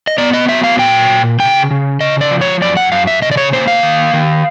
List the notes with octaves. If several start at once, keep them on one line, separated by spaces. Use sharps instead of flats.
D#5
B3 D5
D#5
F#3 E5
F5
A#2 G5
A#2
C#3 G5
C#3
C#3 D#5
D5
F3
C#5
F#2 D5
F#5
F#2 F5
E5
C#3 D#5
D5
C#5
A#3 C5
F5
D#3
D#3